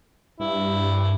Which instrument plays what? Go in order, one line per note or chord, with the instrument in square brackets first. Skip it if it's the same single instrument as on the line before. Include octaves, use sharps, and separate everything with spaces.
[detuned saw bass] G2 [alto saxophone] E4